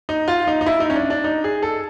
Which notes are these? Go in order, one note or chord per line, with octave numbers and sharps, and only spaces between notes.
D#4
F4
D#4
D#4
E4
D#4
C#4
D4
D4
D#4
G#4
A4